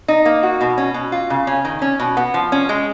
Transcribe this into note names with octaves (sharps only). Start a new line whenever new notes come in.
D#4
A#3
F#4
B2
C#4
B2
F4
C#3
C#4
D#3
C#4
B2
B3
F3
C#4
G#3